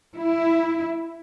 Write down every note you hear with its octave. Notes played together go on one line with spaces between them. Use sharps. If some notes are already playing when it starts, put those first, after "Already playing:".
E4